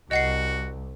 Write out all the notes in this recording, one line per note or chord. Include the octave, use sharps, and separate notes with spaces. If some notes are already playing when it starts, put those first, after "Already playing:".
C2 F#4 D#5 F#5 C7